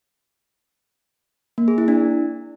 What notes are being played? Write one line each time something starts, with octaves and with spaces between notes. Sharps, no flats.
A#3
G#4
E4
D4